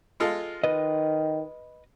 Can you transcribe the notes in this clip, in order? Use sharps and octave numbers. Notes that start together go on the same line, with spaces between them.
G#3 F4 A4
D#3 B4 D#5